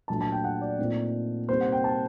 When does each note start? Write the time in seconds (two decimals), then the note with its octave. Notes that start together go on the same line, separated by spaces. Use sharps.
0.08 A#2 F#3 A3 D4 A5
0.21 A5
0.32 G5
0.44 F#5
0.61 D5
0.78 A#2 A3 C4 D#4
1.49 C3 G3 A#3 D#4 C5
1.61 F#5
1.72 G5
1.84 A5